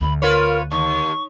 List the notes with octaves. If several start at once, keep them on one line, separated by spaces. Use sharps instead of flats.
D2 B5
F4 A#4 B4 C#5
D#2 C#6